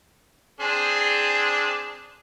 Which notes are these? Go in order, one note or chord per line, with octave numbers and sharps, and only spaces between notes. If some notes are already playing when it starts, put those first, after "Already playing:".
C4 D4 G#4